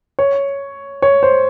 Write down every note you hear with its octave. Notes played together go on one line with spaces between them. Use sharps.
C#5
C#5
C5